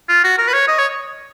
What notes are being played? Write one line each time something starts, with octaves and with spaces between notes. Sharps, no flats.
F4
F#4
A#4
B4
C#5
D#5
C#5